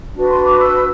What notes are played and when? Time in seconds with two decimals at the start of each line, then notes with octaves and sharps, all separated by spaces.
0.14 D4 F#4 B4
0.29 C6
0.43 D6
0.58 E6